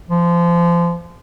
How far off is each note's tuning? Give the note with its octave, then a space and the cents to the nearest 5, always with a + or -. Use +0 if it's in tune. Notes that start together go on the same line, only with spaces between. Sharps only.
F3 -25